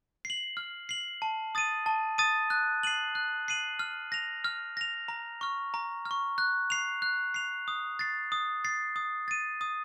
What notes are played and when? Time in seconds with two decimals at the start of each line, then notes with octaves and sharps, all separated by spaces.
0.25 C7
0.30 F#7
0.57 F6
0.89 C7 F#7
1.22 A5
1.55 D#6 A6 D#7
1.86 A5
2.18 D#6 A6 D#7
2.50 F#6
2.83 C7 D#7 F#7
3.15 F#6
3.48 C7 D#7 F#7
3.79 F6
4.12 A#6 F7
4.44 F6
4.77 A#6 F7
5.08 A#5
5.41 C#6 F6
5.74 A#5
6.05 F6
6.11 C#6
6.38 F#6
6.70 C7 F7
7.02 F#6
7.34 C7 F7
7.68 D#6
7.99 A6 C7
8.32 D#6
8.64 A6 C7
8.96 D#6
9.28 A6 D#7
9.61 D#6